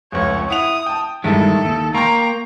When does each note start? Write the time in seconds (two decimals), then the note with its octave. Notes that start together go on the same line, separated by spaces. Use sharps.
0.12 F1 C#2 C#5
0.50 E4 F#5 D#6 F7
0.86 G5 A5
1.24 G2 D#3 G#3 E4 G4 A4
1.65 D#2
1.95 A#3 G5 A#5 C6 C#6